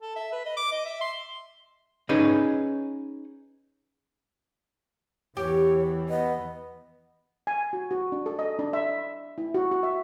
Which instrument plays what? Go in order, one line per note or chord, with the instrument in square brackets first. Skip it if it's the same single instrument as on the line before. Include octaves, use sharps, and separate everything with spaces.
[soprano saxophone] A4
E5
B4
D#5
D6
D#5
E5
C6
[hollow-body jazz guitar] C#4 D#4 G#4 B4 C#5 D#5
[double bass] E2 E3 [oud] G4 [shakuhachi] C#5
[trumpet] B3 [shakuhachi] D#5
[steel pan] G#5
F#4
F#4
D4
A4
D#5
D4
E5
E4
F#4
F#4
E5